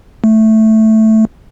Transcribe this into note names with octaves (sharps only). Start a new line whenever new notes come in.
A3